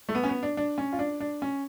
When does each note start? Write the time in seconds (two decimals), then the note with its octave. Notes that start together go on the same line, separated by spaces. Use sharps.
0.09 A3
0.15 B3
0.24 C#4
0.29 B3
0.43 D4
0.57 D4
0.78 C#4
0.93 F4
0.99 D4
1.20 D4
1.42 C#4